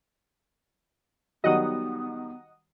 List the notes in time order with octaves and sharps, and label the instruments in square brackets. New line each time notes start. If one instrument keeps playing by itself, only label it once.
[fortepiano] D#3 F#3 G3 [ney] B3 [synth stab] D#5 F#5 D#6